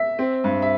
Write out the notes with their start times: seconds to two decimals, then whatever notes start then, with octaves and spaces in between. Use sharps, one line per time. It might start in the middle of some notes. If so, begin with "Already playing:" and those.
Already playing: E5
0.19 C4
0.44 G2
0.62 E5